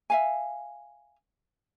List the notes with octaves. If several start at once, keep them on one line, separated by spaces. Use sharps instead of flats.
E5 F5 G#5